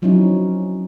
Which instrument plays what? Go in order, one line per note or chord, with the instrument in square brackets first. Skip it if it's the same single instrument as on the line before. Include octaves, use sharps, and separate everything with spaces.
[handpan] F3 F#3 C4 C#4 D#4 E4